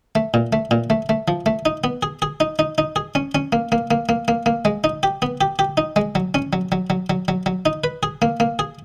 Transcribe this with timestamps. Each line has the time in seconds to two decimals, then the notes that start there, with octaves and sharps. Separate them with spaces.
0.15 A3
0.34 A#2
0.53 A3
0.71 A#2
0.90 A3
1.09 A3
1.28 F3
1.46 A3
1.66 D#4
1.84 B3
2.03 G#4
2.22 G#4
2.40 D#4
2.59 D#4
2.78 D#4
2.96 G#4
3.15 C#4
3.35 C#4
3.53 A#3
3.72 A#3
3.91 A#3
4.09 A#3
4.28 A#3
4.46 A#3
4.65 G#3
4.84 D#4
5.03 G4
5.22 B3
5.41 G4
5.59 G4
5.77 D#4
5.96 G#3
6.15 F#3
6.34 C#4
6.53 F#3
6.72 F#3
6.90 F#3
7.10 F#3
7.28 F#3
7.46 F#3
7.66 D#4
7.84 B4
8.03 G#4
8.22 A#3
8.40 A#3
8.59 G#4